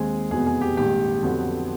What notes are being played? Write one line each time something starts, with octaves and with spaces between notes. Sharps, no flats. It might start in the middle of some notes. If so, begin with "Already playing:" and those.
Already playing: D#2 D#3 G#3 C4 G#4
F1 E2 B2 F#3 B3 G#4
G#4
G4
A#1 G#2 D#3 G3 G4
F2 D3 F#3 B3